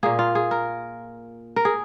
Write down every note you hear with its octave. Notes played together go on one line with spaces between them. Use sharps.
A#2 A#3 G#4
F4
G#4
A#4
A#4
G#4